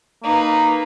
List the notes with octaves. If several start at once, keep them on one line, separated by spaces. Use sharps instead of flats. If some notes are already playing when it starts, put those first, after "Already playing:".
A#3 D#4 B4